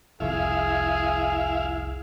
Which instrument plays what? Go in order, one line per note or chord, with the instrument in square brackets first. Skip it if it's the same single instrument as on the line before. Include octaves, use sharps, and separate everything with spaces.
[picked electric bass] F1 C2 [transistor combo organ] E4 F5 [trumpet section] G#4